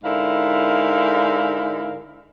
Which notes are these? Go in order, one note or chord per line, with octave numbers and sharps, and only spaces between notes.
G#2 D3 E4 A#4 F5